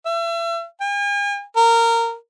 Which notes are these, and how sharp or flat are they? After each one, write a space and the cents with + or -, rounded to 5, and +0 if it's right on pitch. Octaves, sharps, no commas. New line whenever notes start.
E5 +35
G#5 -45
A#4 -15